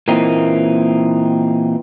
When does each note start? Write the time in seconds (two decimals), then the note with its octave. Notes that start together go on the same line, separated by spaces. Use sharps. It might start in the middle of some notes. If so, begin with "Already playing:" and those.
0.08 A#2 E3 A#3 C4 D#4